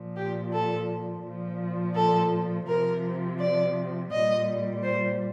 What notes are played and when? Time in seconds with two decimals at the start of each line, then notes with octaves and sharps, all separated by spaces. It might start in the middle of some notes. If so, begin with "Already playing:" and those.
Already playing: A#2 F3
0.16 G4
0.52 A4
1.23 A#2 F3
1.95 A4
2.67 C3 F3 A#4
3.39 D5
4.11 A#2 G3 D#5
4.83 C5